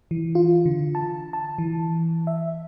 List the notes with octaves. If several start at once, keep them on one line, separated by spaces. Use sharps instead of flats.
E3
F4
D3
A5
A5
E3
E5